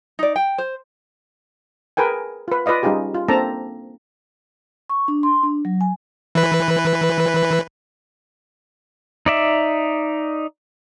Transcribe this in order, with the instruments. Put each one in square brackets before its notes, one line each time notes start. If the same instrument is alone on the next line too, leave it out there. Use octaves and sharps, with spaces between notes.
[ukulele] D#4 D5
G5
C5
[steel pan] G#4 A#4 B4 G5 G#5
F4 B4
F4 B4 D5 D#5 F5
G3 C#4 D#4 F4 G4 G#4
F4
A#3 C4 D4 A4 A5 A#5
[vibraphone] C#6
D4
C6
D4
F#3
G#5
[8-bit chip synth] E3 B4
[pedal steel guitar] D#4 D5 E5